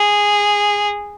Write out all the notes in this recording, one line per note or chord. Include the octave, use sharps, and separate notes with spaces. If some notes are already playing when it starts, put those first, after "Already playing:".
Already playing: G#4